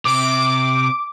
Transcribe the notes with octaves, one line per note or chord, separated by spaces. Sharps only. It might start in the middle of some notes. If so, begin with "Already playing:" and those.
C3 D6